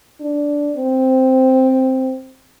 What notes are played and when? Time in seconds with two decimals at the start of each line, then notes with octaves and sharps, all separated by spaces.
0.20 D4
0.76 C4